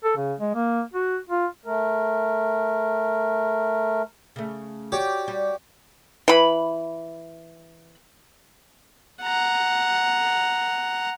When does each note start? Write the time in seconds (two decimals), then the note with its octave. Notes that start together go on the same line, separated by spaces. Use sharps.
0.04 A4
0.17 C#3
0.40 G#3
0.55 A#3
0.94 F#4
1.29 F4
1.66 A3 A#4
4.36 C#3 A3
4.92 F#4 G4 C#5 D5
5.28 G3
6.28 E3 B5
9.23 F#5 A#5